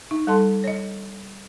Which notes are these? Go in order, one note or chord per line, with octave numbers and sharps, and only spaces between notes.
D#4
G3 A4 D#5 A5 C6
C#5 D#5